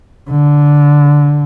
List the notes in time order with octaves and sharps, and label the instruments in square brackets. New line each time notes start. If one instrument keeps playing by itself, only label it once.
[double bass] D3